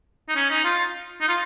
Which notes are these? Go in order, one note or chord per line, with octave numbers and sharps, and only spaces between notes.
D#4
C#4
D#4
F4
D#4
F4